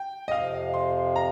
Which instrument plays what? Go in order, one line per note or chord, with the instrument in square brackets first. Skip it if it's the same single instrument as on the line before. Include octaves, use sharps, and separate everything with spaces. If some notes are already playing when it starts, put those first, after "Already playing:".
Already playing: [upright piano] G5
D#5
[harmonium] F2 C3 F3 [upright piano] F5
[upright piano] C6
A#5